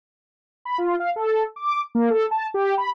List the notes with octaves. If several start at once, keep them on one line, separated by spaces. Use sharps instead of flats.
B5
F4
F5
A4
D6
A#3
A4
A5
G4
B5